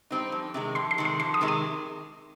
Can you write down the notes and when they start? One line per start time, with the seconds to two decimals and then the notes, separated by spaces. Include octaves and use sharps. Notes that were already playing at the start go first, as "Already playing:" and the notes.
0.10 G3 C4 D#4
0.32 F2
0.54 C3 D#3 G#3
0.75 F2 C6
0.91 C6
0.98 C3 D#3 G#3
1.05 C6
1.20 F2 C6
1.34 D#6
1.41 C3 D#3 G#3
1.48 D#6